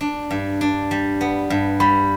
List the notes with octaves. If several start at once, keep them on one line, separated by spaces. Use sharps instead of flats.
D4
G2
D4
G3
B3
G2
G3 B5